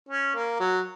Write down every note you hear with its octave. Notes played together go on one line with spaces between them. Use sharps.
C#4
A#3
F#3